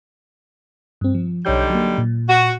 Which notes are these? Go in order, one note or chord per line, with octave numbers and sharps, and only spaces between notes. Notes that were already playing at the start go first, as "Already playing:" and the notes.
G2 C4
F3
B1 D3 G3 D#4 C#5 G6
F#3 A#3
A#2
F#4